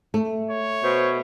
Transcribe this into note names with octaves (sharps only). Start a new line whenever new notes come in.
A3
C#5
B2 C5